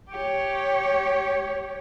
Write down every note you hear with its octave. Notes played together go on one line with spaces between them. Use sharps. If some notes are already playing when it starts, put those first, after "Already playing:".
G4 C#5